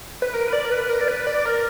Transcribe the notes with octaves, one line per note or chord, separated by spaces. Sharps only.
B4
A#4
B4
D5
A#4
B4
A#4
D5
B4
D5
A#4